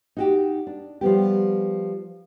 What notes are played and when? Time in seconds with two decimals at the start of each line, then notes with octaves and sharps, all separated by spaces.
0.17 D#4 F#4 G4
0.67 D4
1.01 F3 G3 B3 G4